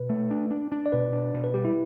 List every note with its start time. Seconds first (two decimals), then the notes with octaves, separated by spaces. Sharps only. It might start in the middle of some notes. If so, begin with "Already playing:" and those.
Already playing: B2 B4
0.09 A3
0.31 D4
0.50 D4
0.72 D4
0.86 D5
0.92 B2 B4
1.12 D4
1.34 B2
1.44 B4
1.54 G3 G4
1.65 E4